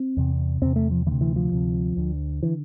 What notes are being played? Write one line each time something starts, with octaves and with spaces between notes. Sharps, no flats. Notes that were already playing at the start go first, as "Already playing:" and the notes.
Already playing: C4
E2 C3
E2 C3 C4
A3
F3
D2 C3 E3
E3
F3
D2 C3
D2 D3
D3 E3